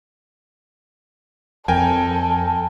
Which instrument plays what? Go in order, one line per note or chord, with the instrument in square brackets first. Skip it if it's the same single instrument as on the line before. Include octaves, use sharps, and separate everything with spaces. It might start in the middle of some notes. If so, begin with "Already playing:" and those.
[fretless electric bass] F2 [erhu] A4 [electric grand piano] A#4 G5 G#5